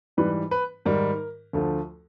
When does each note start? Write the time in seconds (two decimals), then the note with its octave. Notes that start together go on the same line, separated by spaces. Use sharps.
0.17 G#2 E3 G3 B4
0.51 B4
0.85 G#2 D#3 G3 A#4
1.53 D2 D3 F3 A3